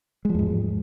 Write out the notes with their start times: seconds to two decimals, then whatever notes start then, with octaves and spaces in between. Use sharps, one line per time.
0.25 G#3
0.29 F3
0.34 E2
0.39 G#2